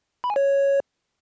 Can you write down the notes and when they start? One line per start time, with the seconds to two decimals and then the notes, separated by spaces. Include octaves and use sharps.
0.24 B5
0.30 G#5
0.36 C#5